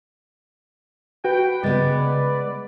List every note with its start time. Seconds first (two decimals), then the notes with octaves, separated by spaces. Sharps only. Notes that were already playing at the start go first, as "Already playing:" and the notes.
1.25 F#4 B4 G5
1.63 C#3 G#3 B3 D5 A6